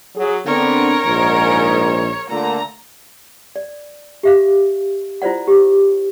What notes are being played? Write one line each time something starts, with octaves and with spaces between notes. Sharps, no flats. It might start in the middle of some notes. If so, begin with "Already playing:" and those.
F#3 G#4
D3 B3 C4 D4 A#4 C#5
A#1 G#2
A#2 D3 A3 A#5
D5
G4 E5 F5
E4 F4 C5 D5 F#5
G4